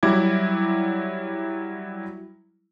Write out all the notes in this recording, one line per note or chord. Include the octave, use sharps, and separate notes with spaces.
F#3 G3 E4 D6 G#6